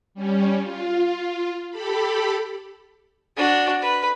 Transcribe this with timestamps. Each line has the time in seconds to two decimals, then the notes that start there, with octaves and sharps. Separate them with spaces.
0.14 G3 C#4
0.62 F4
1.70 G4 A4 B5
3.37 D4 F#4
3.81 B4